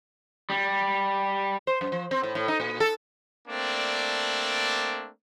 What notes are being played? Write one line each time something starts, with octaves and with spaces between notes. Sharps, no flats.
G3
C5
F#2
F3
C4
A2
A2
D#4
A#2
A4
A3 A#3 C4 D4 D5